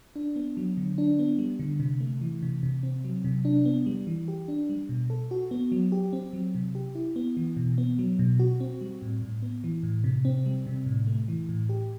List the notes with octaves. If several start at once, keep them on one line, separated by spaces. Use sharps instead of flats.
D4
B3
F#3
D3
D4
B3
G3
D3
C3
A3
E3
C3
C3
C4
F#3
C3
D4
B3
G3
E3
G4
D4
G3
B2
A4
F#4
B3
F#3
G4
C4
F#3
C3
G4
E4
B3
E3
B2
B3
F#3
B2
F#4
C4
G3
A2
A2
B3
E3
A2
C3
C4
G3
C3
A2
A3
E3
A2
G4